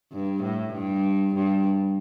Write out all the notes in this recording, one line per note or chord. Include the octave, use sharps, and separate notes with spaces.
G2
A2
G2
G2